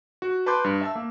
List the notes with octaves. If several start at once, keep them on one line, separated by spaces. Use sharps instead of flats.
F#4
B4 A5 C6 D6 G6
G2
E5 A5 E6
A#3